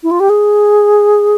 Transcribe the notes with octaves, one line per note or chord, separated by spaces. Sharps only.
E4
F4
G4
G#4